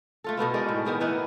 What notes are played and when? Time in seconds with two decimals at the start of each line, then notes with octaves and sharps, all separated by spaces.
0.24 A3 F4 A4
0.37 B2 A3 B3 E4
0.54 G#3 D#4 A#4 D5
0.69 A2
0.85 D#3 B3 G#4 A#4
1.00 E3 B3 D#4 E4